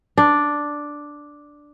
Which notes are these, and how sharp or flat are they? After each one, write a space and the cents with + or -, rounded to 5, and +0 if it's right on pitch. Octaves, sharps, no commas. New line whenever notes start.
D4 +0